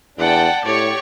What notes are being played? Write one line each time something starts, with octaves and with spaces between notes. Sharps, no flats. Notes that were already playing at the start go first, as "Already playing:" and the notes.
E2 D4 D5 F#5 G5 A5
A2 G4 C#5 D5 C#6